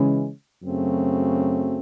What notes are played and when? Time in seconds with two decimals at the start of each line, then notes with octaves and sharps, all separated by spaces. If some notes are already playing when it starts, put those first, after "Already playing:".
Already playing: C#3 E3 G#3 C#4
0.62 F#2 C#3 F#3 A3 C4